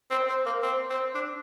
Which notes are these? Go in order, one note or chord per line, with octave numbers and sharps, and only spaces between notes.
C4
C4
A#3
C4
C4
D4